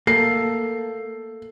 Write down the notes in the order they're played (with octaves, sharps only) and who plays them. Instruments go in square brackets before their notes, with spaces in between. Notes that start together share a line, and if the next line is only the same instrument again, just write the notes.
[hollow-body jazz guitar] A#3 [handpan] A4 [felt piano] C7